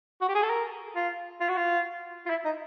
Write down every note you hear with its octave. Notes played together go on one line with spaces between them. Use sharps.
F#4
G4
G#4
A4
A#4
F4
F4
F#4
F4
F4
E4
D#4